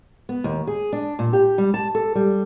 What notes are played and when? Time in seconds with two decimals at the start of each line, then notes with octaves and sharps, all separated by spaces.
0.29 B3
0.44 D#2
0.67 G#4
0.93 D4
1.19 A#2
1.33 G4
1.58 G3
1.74 A5
1.95 A4
2.15 G3